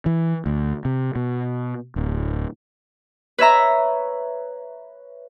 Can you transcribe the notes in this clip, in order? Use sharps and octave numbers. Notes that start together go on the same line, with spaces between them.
E3
D2
C3
B2
D1
B4 C#5 E5 A#5